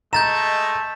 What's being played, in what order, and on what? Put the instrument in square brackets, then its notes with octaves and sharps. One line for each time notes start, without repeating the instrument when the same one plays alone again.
[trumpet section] G#3 A3 D#5 [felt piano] A#5 [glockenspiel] G6 A6 E7